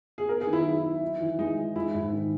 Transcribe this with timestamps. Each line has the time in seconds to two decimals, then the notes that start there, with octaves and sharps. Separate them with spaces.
0.18 G#4
0.29 B3 A#4
0.41 G#4
0.47 D#3
0.53 E4
0.66 F#3
0.84 E4
1.02 D#4
1.20 E3
1.39 G#3 D#4
1.58 E3
1.76 G#3 E4
1.94 G#2
2.13 D#3